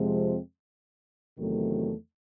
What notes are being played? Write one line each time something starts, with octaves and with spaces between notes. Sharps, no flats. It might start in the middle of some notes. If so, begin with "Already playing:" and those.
Already playing: F2 C3 F3 G#3 C4
E2 C3 D#3 F#3 A3